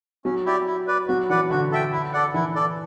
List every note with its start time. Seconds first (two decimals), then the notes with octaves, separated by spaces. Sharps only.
0.25 F#3 C#4
0.46 E4 G4 D5
0.66 E4
0.87 B4 D5
1.08 F#3 F#4
1.30 E3 B4 D5 F#5
1.50 D3 F#4
1.72 A4 E5 G5
1.92 E4
2.13 A4 D5 F#5
2.34 E3 E4
2.55 A4 D5